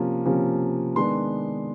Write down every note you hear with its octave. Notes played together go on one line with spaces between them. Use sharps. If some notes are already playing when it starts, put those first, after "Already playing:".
Already playing: C3 F3 A#3 C#4
C3 F3 A#3 C#4
D#3 G#3 B3 D4 C6